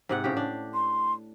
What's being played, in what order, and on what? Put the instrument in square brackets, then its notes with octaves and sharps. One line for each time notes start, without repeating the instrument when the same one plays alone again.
[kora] G#2 C3 F#5
A2 C#3 G4
D4
[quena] C6